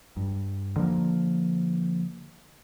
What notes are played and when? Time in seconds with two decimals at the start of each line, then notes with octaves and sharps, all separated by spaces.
0.17 G2
0.76 D3 F3 A#3